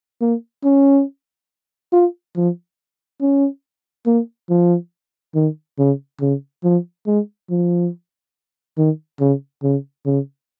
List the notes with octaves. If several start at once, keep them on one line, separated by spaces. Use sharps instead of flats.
A#3
C#4
F4
F3
C#4
A#3
F3
D#3
C#3
C#3
F3
G#3
F3
D#3
C#3
C#3
C#3